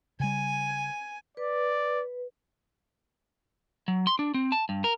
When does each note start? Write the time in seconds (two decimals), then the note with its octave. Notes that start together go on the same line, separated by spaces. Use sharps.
0.20 C#3 G3 G#5
1.37 B4 D5
3.88 F#3
4.07 C6
4.19 D4
4.34 C4
4.52 A5
4.69 G2
4.84 A#4